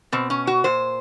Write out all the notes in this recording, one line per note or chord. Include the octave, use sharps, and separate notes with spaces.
B2 C4
C#4
F#4
A#2 C5